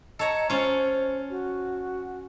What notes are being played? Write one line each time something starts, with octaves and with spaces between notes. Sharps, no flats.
A4 C#5 D#5 A#5
C#4 F4 C5
F#4